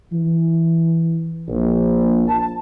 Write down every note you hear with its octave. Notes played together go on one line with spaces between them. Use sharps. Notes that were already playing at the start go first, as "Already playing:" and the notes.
E3
A#1
A5